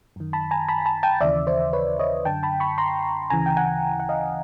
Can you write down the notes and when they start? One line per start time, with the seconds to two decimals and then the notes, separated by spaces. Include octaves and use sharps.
0.16 F#2 D#3
0.33 A5 B5
0.51 G#5 A#5
0.68 A5 B5
0.86 A5 B5
1.03 G5 A5
1.21 D#2 C#3 E3 D5 E5
1.47 C5 D5
1.73 B4 C#5
1.99 C#5 D#5
2.25 F#2 D3 G5 A5
2.43 A5 B5
2.60 B5 C#6
2.78 A#5 C6
3.30 D2 C#3 E3 G#5 A#5
3.46 G5
3.57 F#5 G#5
4.00 F#5
4.09 D#5 F5